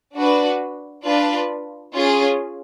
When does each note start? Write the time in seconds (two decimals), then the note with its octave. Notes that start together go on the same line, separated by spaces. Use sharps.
0.15 D4 F#4 B4
1.04 D4 F4 B4
1.94 C#4 F4 G#4